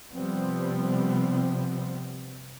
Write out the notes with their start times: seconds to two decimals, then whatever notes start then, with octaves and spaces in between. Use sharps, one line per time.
0.12 C3 F3 G3 B3 C4